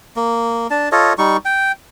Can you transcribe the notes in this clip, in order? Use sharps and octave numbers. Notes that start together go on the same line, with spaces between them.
A#3
D4 A5
F4 A4 C#5 D#5
G3 D#4 C#6
G5